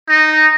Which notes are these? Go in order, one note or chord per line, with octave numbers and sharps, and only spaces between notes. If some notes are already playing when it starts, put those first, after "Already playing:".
D#4